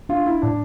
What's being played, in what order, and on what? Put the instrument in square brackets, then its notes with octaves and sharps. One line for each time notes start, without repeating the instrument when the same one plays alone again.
[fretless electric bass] D4 [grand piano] F4
[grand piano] E4
[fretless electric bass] A2 [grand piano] D4